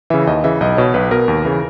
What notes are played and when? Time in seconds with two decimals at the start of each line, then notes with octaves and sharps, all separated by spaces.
0.10 C#3 E3 E5
0.27 D#2 D#5
0.44 C#3 E3 E5
0.61 B1 D#5
0.77 B2 C#5
0.94 B1 B4
1.11 B2 A#4
1.28 D#2
1.45 C#3 E3